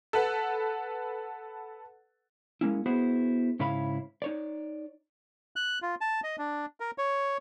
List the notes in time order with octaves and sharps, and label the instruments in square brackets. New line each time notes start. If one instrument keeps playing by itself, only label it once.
[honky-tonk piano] A4 B4 F#5
[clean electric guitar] G#3 A#3 C#4 E4
B3 E4 F#4 G#4 C5
G#2 C#3 E4 C#5 F5 B5
D#4 C#5 D5
[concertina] F#6
F4
A5
D#5
D4
A#4
C#5